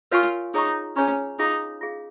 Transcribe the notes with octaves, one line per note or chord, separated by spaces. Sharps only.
F4 A#4 C#5 F5 G#5 C#6
D#4 G#4 C#5 A#5 C#6
C#4 G#4 C#5 A#5 C#6
D#4 F4 G#4 F5
F4 G#4 F5